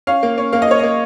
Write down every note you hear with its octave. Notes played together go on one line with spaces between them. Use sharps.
C#4 F5
A#3
C#4
A#3 F5
D#5
A#3 C#5
A#3 D#5